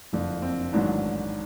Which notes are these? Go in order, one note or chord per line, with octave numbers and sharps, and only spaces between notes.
F#1 F2 D3 D4
C4
A1 G#2 D#3 F#3 D4